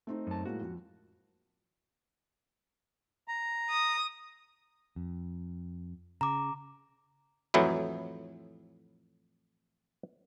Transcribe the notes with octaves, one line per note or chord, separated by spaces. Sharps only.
A3 C4 D#4
F#2 A5
A2 G#3 A#3 F#4
F2
A#5
D#6
F2
C#3 A#5 D6
F2 A2 E3 F#3 E4